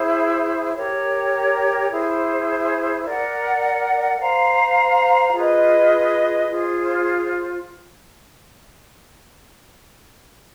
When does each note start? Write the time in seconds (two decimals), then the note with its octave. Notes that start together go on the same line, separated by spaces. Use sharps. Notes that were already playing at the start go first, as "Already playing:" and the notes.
Already playing: E4 G#4 C5
0.75 G4 A#4 C#5
1.90 E4 G#4 C5
3.05 A#4 D5 F#5
4.20 C5 F5 A#5
5.33 F4 G#4 B4 D#5
6.48 F4 G#4 C5